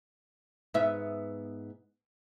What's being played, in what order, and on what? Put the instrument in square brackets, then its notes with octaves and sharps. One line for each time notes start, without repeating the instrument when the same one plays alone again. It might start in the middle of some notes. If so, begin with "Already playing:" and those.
[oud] G#2 B3 E5